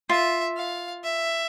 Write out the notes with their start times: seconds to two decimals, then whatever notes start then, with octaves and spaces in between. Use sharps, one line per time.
0.10 F4 E5
0.57 F5
1.03 E5